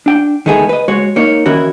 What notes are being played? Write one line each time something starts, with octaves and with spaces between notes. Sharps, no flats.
D4 G5
D#3 G#3 A3 B3 G#4
B4 D#5
G#3 F#4 C#5
A#3 D#4 C#5
D#3 E3 C#4 E4 F#4 A#4